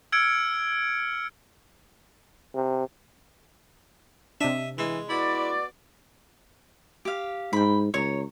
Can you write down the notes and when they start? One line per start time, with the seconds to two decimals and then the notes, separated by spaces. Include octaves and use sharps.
0.12 E6 F6 G#6 C#7 D7
2.54 C3
4.41 C3 D4 D#5 E5
4.78 E3 G#3
5.10 B3 E4 F#4 D5
7.05 G4 F5
7.53 G#2 G5 B5
7.94 C#2 C#5 A#5